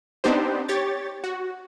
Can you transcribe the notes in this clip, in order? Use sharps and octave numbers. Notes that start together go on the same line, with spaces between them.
B3 C4 D4 D#4 G4 C5
G4 C#5 A6
F#4